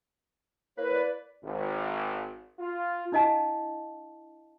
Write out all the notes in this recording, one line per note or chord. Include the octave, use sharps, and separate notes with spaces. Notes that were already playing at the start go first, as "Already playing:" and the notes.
A#3 E4 B4 C#5
D5
G#1
F4
D4 E4 D#5 F5 A5